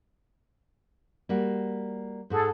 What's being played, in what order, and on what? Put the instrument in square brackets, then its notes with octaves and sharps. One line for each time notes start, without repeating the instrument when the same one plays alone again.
[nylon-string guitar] G3 A#3 F#4
[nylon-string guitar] G#2 F#4 [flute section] G#4 A4